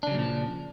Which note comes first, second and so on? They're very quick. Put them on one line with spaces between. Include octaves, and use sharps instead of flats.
D4 C#3 F#3 A#2 F3